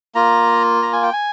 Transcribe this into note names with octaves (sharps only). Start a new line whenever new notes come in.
A#3 F4 A#5
A#5
G#5
G5
G#5